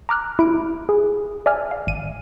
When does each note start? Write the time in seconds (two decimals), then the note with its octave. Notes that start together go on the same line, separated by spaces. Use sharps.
0.09 A#5 D6 F6 F#6
0.39 E4 D7
0.89 G#4
1.46 D5 E5 G#5 F6
1.71 F5
1.87 G#1 D#7